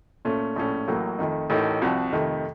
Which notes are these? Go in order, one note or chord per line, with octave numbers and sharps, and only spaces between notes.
A#2 A3 C#4
A#1 A2 A3 C#4
A1 A2 F#3 A#3
F2 D#3 A3
A1 A2 A3 D#4 A#4
C2 C3 F3 C4 F#4
F2 C3 D#3 A3